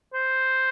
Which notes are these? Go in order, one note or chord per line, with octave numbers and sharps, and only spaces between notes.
C5